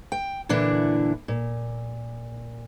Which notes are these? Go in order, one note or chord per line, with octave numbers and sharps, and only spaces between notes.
G5
A#2 D3 E3 D4 E4
A#2